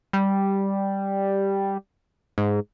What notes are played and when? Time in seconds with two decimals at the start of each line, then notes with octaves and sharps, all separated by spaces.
0.13 G3
2.38 G#2